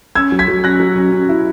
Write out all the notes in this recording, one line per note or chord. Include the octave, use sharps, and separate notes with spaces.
C#4 E6 G#6
F#3
G#6 B6
F#3
C#4 F#6 A#6
F#3
C#4
C#4
E4